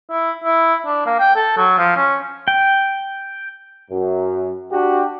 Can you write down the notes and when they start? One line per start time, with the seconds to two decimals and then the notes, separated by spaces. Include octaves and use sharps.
0.11 E4
0.44 E4
0.86 D4
1.06 A#3
1.20 G5
1.36 A4
1.57 F#3
1.78 F3
1.97 C#4
2.48 G5
3.91 F#2
4.71 D4 F#4 G4